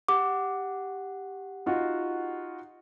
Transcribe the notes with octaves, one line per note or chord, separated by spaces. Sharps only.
G4 F#5 D6
D#4 F4 F#4